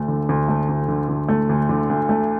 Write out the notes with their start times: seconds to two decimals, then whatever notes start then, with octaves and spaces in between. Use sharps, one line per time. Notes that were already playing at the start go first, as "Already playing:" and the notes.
Already playing: D2 A3
0.08 D3
0.29 D2
0.48 A3
0.69 D2
0.88 D3
1.09 D2
1.29 A3
1.49 D2
1.69 D3
1.90 D2
2.09 A3